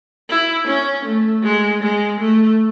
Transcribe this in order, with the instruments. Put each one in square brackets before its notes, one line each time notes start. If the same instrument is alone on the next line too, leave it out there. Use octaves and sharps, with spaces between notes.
[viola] E4
C#4
A3
G#3
G#3
A3